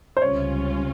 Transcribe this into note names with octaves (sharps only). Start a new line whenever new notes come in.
C5
C#2 C3 G3 C#4 F4 C#5